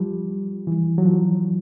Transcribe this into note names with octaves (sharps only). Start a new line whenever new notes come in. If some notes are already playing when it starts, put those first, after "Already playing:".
Already playing: F3 G3
E3
F#3
F3